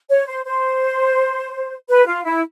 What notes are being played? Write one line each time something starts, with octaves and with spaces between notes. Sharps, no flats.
C#5
C5
C5
B4
F4
E4